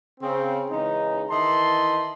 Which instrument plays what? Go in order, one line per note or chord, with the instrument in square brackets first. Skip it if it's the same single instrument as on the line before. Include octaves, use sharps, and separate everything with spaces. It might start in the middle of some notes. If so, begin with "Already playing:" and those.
[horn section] C#3 C4
C#3 E3 G#3 C#4 D#4
D#3 E3 D#4 E4 A5 C6